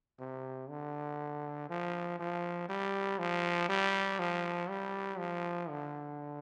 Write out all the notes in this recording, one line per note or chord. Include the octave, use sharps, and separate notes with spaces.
C3
D3
F3
F3
G3
F3
G3
F3
G3
F3
D3